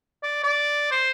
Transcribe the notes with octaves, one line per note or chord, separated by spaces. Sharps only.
D5
D5
C5